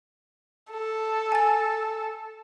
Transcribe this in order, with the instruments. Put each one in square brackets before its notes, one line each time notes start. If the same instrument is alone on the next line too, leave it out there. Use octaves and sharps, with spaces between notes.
[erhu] A4
[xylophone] G#5 A6